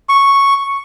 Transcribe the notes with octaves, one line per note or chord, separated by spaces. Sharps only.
C#6